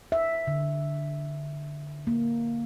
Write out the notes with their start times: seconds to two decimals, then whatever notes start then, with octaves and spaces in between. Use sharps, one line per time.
0.12 E5
0.47 D3
2.07 A#3